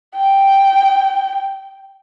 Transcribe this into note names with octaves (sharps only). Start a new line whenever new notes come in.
G5